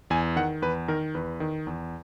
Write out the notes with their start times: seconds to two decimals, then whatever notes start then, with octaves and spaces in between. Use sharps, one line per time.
0.10 E2 G#5
0.36 D#3 F#5
0.62 E2 B4
0.88 D#3 A#4
1.15 E2 B4
1.40 D#3
1.67 E2